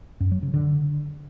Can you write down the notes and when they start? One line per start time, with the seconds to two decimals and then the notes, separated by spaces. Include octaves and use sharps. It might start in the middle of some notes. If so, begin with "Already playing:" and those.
0.20 F#2
0.31 F#3
0.43 C#3
0.54 D3